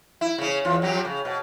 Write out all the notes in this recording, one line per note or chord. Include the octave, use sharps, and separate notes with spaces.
E4
C#3 C#4
E2 F4
F2 F#3 G4
C#3
B2